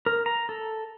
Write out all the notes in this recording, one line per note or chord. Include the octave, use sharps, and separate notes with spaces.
A#4
A#5
A4